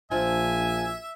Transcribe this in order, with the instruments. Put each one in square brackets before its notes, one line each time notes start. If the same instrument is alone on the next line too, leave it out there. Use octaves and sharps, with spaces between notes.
[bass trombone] A#1 [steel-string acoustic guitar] F3 D4 F4 [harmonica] E5 [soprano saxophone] G#5